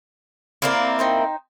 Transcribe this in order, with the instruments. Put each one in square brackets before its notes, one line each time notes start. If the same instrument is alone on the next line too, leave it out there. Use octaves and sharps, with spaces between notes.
[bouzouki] A#3 C4 E4 [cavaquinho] A#4 D5 F5
[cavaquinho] D#4 C5 G5